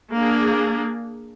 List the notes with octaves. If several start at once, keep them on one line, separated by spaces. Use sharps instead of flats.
A#3 D4 G#4